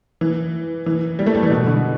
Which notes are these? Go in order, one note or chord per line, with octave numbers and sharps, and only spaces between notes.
E3
E3
G3
A3
G3
E3
B2
D3